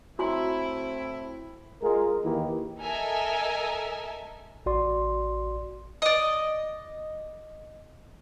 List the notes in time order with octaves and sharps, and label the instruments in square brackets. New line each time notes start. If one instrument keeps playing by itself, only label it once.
[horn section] A2 C4 E4 [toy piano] F#4 A#5 C6
[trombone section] G#3 F4 A#4
D#2 D#3 E3 A#3 E4 G4
[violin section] A4 A#4 D#5 E5 G#5
[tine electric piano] A1 F#4 D5 C6
[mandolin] D5 D#5